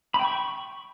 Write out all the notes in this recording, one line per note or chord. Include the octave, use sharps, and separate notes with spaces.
B5
G5
C#6